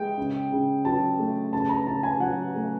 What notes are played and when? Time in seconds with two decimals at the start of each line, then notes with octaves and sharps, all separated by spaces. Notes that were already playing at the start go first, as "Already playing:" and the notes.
Already playing: G#3 G5
0.17 C#3
0.52 C#3
0.85 F#3 A5
1.19 A3
1.53 C#3 A5
1.69 A#5
1.87 C#3 A5
2.03 G#5
2.20 F#3 F#5
2.55 A3